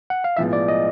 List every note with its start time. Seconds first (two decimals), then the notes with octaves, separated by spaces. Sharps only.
0.10 F#5
0.24 F5
0.37 B1 A2 F3 G#3 B3 E5
0.53 D5
0.68 D#5